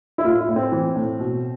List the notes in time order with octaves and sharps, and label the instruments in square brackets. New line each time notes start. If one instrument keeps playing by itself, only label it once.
[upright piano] E4
A2 F4
E4
A2
C4
E3
A2
B2